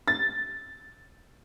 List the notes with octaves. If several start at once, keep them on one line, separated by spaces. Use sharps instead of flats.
A6